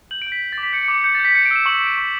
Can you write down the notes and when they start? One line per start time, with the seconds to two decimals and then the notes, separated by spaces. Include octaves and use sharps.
0.11 G6 F#7
0.22 D7
0.27 G6
0.32 B6
0.42 G6
0.52 A6
0.58 D6
0.63 B6
0.73 G6 C#7
0.83 C#7
0.88 D6
0.94 C#7
1.04 G6 C#7
1.15 A6
1.20 G6
1.25 B6
1.35 G6 C#7
1.46 D7
1.51 E6 E7
1.66 C#6 F#7
1.77 E7
1.82 G6
1.87 D7
1.97 C#6